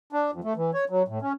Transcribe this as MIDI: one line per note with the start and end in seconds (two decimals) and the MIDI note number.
0.13 0.31 62
0.33 0.40 41
0.44 0.53 57
0.57 0.71 52
0.74 0.84 73
0.90 1.03 54
1.08 1.19 45
1.22 1.33 61